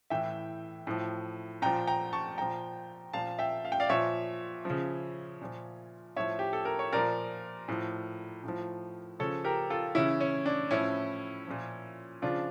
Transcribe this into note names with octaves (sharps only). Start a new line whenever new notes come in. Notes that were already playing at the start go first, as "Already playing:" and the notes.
A2 E3 E5 G5
A2 F3
A#2 F3 G5 A#5
G5 A#5
A5 C#6
A#2 F3 G5 A#5
A#2 F3 F5 A5
E5 G5
F5
G5
D5 F5
A#2 F3 C#5 E5
C#3 F3
A#2 F3
A2 F3 C#5 E5
G4
A4
A#4
C#5
A#2 F3 A#4 D5
A2 F3
A2 F3
C#3 F3 A4 C#5
G4 A#4
F4 A4
C#3 E3 C#4 E4
C#4
D4
A2 F3 C#4 E4
A#2 F3
C#3 F3 D4 F4